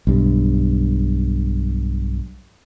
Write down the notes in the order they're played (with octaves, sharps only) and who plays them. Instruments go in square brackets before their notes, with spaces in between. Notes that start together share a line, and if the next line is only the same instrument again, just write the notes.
[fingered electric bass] B1 G2